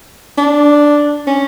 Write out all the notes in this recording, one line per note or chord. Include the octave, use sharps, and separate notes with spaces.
D4
C#4